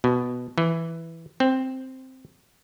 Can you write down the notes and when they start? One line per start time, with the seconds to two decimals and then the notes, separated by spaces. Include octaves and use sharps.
0.04 B2
0.58 E3
1.40 C4